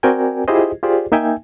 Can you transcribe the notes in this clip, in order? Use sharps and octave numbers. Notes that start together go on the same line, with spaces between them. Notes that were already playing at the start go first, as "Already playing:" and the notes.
C4 F#4 A#4 D5 G5 G#5
E4 F4 G4 G#4 C5 D#5
F4 G4 G#4 C5 D5
A#3 D#4 E5 G5 G#5